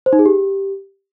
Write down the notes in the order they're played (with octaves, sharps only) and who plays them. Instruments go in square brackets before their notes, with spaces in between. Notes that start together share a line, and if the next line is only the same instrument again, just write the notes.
[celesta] C5
D#4
G#4
G4